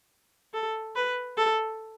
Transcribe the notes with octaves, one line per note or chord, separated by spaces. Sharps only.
A4
B4
A4